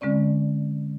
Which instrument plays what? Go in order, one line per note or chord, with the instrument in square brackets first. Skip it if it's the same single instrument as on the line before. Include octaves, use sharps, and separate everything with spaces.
[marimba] D3 G#3 C4 C#4 D5